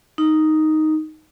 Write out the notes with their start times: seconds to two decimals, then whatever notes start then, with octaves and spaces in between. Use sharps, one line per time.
0.18 D#4